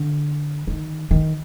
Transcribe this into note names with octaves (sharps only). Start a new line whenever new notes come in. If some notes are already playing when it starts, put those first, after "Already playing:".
Already playing: D3
D#3
D#3